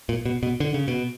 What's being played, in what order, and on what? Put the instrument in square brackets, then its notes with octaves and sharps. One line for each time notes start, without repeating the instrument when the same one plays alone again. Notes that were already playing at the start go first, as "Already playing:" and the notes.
[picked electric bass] A#2
B2
B2
D3
C#3
B2